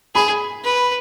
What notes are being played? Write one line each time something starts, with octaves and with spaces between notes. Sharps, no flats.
G#4 B5
B4